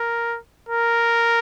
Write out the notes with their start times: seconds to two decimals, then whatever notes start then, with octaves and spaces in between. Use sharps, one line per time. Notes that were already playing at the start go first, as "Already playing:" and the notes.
Already playing: A#4
0.69 A#4